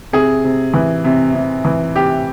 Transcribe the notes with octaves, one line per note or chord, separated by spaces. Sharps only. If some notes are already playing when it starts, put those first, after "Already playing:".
C3 G#4
C3
E3
C3
C3
E3
C3 G4